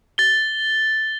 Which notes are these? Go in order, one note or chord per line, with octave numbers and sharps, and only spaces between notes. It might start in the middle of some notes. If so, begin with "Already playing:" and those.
A6 G7